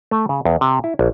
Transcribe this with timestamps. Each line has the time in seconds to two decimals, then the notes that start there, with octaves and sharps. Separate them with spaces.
0.11 A3
0.29 C#3
0.45 E2
0.61 C3
0.84 E4
0.99 A#1